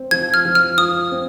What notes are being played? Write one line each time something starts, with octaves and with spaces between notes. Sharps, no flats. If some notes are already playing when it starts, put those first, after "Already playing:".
Already playing: C4
F3 G#6
F6
F3
F6
F4 D#6
C4